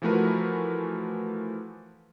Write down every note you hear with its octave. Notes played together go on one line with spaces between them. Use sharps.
E3 F3 A3 F#4 A#4 B4